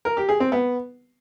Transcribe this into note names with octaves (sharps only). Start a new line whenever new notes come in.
A#4
G4
G#4
C4
B3